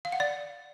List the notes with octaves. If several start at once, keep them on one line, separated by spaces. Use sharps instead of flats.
F5
F#5
D5